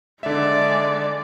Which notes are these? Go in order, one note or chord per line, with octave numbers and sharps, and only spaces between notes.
D3 G#3 D5 E5